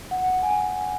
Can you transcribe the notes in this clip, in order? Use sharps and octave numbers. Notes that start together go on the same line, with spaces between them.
F#5
G#5